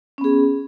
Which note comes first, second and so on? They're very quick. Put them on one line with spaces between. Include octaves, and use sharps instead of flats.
C#4 B3 G#4